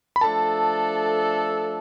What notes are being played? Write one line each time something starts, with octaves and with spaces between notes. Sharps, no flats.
B5
F3 A3 D4 A4 A5